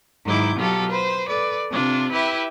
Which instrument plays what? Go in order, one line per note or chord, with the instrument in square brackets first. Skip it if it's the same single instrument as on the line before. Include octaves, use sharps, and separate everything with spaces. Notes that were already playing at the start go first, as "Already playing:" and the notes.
[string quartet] G#2 D#3 F#3 E4 D6 G6
B2 F#3 F4 G4 A4
B4 C5
A4 B4 D5
C3 D4 F4
E4 G4 B4 E5